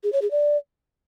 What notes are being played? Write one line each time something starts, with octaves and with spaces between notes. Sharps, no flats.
G#4
C#5
G#4
D5